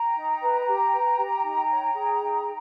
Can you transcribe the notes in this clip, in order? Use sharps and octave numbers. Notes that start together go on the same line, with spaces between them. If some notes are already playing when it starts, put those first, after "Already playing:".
Already playing: G5 A#5
D#4
B4
G4
B4
G4
D#4
C#5
G#4
D#4
D#4